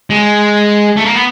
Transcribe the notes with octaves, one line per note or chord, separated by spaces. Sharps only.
G#3
A3
A#3
B3